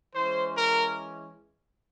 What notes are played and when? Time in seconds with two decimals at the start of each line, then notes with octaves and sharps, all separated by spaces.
0.15 E3 G#3 C#4 C5
0.56 A#4